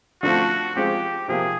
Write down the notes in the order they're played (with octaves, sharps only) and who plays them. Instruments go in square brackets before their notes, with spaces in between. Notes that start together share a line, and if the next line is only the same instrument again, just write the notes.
[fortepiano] D3 F3 A3 C4 F4 [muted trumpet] F#4
[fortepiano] F3 G#3 C4 F4 [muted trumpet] G4
[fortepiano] C3 F3 A#3 [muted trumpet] G#4